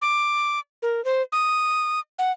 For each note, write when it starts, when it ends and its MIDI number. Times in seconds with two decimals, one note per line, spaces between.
0.02 0.59 86
0.82 1.04 70
1.05 1.22 72
1.32 2.00 87
2.19 2.32 78